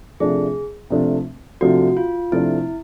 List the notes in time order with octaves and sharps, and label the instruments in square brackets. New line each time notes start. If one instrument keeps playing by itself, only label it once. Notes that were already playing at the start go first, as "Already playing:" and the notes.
[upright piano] C3 F3 A3 D4 [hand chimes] G#4
[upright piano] C3 F3 A3 D4
[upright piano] C3 F3 A3 D4 [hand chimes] F#4
[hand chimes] F4
[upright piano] C3 F3 A3 D4 [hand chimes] E4